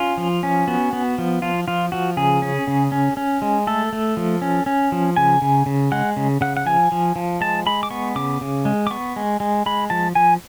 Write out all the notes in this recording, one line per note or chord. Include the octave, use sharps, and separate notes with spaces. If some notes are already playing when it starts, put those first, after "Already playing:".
Already playing: C#4 F4
F3
C#4
B3 F#4
B3
F3
F3 F4
F3 F4
F3 F#4
C#3 G#4
C#4
C#3
C#4
C#4
G#3
A3 A4
A3
F3
C#4
C#4
F3
C#3 G#5
C#3
C#3
G#3 F#5
C#3
C#3 F#5
F#5
F3 G#5
F3
F3
G#3 A5
G#3 B5
D6
B3 C#6
C#3 D6
C#3
G#3
D6
B3 C#6
G#3
G#3
G#3 B5
F3 A5
F3 G#5